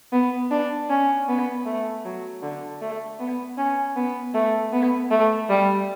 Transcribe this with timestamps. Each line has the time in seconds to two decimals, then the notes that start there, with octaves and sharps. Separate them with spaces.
0.12 B3
0.51 D4
0.89 C#4
1.28 B3
1.65 A3
2.05 F#3
2.42 D3
2.81 A3
3.20 B3
3.57 C#4
3.96 B3
4.34 A3
4.72 B3
5.10 A3
5.49 G3